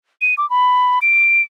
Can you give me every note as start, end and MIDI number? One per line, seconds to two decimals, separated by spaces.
0.22 0.34 99
0.38 0.48 86
0.50 0.99 83
1.02 1.42 98